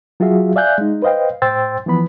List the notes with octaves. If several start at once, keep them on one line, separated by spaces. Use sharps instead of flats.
F#3 F4 F#4 G#4 E5 F5
D5 E5 F5 G#5 F#6 G6
G#3 D#4
B4 C5 D#5 F5 G5
A2 C5 G5 C6 E6 A6
E3 F3 B3 B5